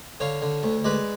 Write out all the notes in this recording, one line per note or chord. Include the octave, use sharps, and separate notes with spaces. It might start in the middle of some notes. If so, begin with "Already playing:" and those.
D3 C#5 F5
D3
D2
G#3 B4 D5